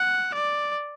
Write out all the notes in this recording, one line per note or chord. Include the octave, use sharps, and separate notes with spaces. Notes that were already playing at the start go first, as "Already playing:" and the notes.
Already playing: F#5
D5